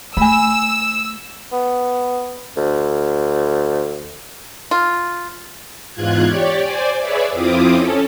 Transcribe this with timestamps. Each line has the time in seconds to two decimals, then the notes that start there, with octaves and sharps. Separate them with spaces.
0.17 A3 G#5 B5 E6
1.52 B3
2.57 D2
4.71 F4
5.93 E2 G#2 F4 F#6 G#6
6.26 G4 C#5 D5
6.62 C5 D5 G#5
7.00 G#4 B4 C#5 D5 E5
7.32 F2 C4 E4 F4 D6 D#6
7.73 C#4 A4